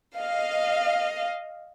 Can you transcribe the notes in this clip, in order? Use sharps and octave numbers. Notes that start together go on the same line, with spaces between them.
D#5 F5